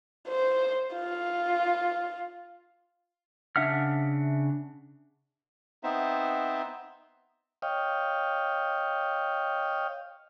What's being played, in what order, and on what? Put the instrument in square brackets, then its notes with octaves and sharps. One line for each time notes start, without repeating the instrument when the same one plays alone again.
[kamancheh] C5
F4
[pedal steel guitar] C#3 D4 E5 F#5 F6
[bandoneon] B3 C4 D#4 C5 E5
[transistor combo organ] C#5 D#5 F5 G5